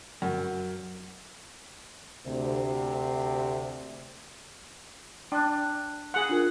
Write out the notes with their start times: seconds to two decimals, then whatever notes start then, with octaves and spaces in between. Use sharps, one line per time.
0.22 F#2
2.26 D2 C3
5.32 D4 G5 F#6
6.14 G#4 F#5
6.29 D4 F4 A#4